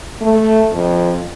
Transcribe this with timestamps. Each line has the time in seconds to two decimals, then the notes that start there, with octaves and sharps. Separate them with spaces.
0.22 A3
0.72 F2